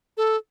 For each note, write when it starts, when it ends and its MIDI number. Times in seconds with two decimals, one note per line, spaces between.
0.17 0.37 69